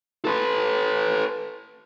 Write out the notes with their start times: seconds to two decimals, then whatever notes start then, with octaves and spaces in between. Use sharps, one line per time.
0.25 A4 B4